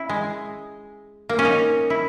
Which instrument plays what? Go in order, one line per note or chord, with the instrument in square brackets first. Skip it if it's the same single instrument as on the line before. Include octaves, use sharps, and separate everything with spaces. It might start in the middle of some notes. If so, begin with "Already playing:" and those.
Already playing: [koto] C#4 E4
G#3
A#3
C#4
D#4
E4